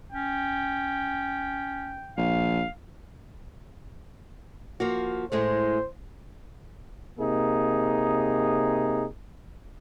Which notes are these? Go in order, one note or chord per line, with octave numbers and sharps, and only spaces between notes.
C#4 G5
A#1 F5
F3 A#3 F#4
A2 G#3 A3 C5
C3 A#3 D#4 G#4